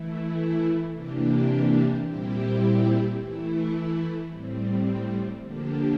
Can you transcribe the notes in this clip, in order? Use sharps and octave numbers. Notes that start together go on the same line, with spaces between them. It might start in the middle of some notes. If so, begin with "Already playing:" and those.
Already playing: E3 A3 E4
C3 E3 A#3 D4 G4
A#2 G3 C4 E4 G4
E3 A3 E4
A2 G3 C4
D3 F3 A#3 D4 G4